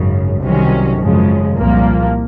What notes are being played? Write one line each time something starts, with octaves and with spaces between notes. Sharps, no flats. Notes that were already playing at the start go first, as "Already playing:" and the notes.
Already playing: G#1 F#2 C#3
C2 C3 D#3 F#3 C#4
G#1 F#2 C#3 F3 G#3
C2 A#2 F3 A#3